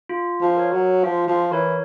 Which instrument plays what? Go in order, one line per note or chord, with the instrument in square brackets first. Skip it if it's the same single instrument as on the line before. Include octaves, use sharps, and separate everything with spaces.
[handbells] F4
[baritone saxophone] F3
[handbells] A#4 C#5
[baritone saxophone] F#3
[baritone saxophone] F3 [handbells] F4
[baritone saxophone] F3
[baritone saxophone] E3 [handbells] A#4 C#5